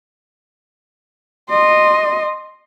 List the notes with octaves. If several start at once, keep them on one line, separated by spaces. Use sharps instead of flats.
D#5 C6